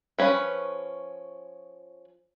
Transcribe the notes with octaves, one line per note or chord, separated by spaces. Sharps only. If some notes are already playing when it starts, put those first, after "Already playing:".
F3 C#4 B4 B5